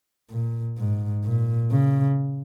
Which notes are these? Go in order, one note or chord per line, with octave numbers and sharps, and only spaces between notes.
A#2
G#2
A#2
C#3